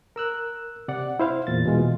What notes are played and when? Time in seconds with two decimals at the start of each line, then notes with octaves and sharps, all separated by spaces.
0.16 A#4 E6 F#6
0.88 C3 D5 F#5
1.20 E4 C5 F5
1.47 E2 A#2 A6
1.66 B2 E3 G#3 F4